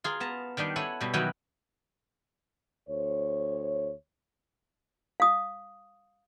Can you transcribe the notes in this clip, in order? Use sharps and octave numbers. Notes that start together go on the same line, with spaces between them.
F4 G#4 A#4
B3 A5 A#5
D#3 G3 D4 D#4
E4 A4 C#5 F#5 G#5
B2 G3
D#3 E3 F#3 D#4 F#5 B5
D2 C5 C#5
F5 D#6